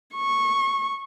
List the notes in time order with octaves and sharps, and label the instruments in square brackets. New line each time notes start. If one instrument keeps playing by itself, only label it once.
[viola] C#6